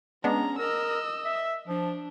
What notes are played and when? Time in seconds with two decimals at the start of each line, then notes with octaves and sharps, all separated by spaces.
0.24 G#3 B3 C#4 D4 A#5
0.59 A#4 D#5 E6
1.25 E5
1.68 F3 D4